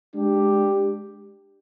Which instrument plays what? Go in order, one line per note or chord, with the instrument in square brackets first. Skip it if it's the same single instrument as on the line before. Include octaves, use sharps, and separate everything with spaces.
[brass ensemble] G#3 D4 G4